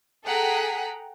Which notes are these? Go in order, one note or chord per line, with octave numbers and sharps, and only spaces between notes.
G#4 A4 F#5 G5 A#5 B6